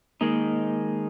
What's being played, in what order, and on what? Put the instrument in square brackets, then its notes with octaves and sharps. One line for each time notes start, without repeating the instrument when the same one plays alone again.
[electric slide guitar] D#3 G#3 D#4 [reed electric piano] A#3